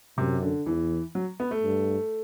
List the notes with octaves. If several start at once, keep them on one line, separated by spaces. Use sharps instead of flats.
F#2 C3
D3
E2 E3
F#3
B3
A3
G2